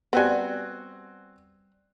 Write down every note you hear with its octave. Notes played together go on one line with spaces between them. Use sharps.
G3 B3 C4 F#4 G#5